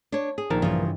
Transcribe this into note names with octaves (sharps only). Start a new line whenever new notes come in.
D4 C#5
G#4
A#1 D#3 F3 A#4 A5
G2 C#3 E3 F3 G3